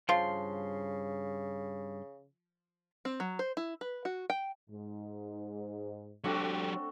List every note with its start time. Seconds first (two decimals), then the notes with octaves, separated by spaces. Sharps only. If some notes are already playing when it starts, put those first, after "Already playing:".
0.09 G2 C#3 F3 F5 C6
3.05 C4
3.20 F#3
3.39 C5
3.57 E4
3.81 B4
4.05 F#4
4.30 G5
4.70 G#2
6.24 F#3 A3 C4 D4 F#4 G4 A4 B6